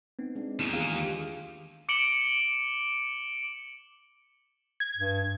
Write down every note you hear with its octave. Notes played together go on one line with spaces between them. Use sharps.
B3 C4 D#4
G#3 D4
D#2 D#3 E4
E3 F4 G#4 F5
G#3 G4
D6 C#7 D7 F#7 G7
G#6
G2